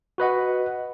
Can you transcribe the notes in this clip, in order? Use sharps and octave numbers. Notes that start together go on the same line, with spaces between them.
F#4 B4 D#5 F#5